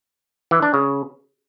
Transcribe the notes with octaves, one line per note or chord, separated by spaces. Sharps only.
E3
D4
C#3